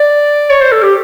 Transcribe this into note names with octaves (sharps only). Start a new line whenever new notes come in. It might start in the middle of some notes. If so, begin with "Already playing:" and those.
Already playing: D5
C#5
C5
A4
G4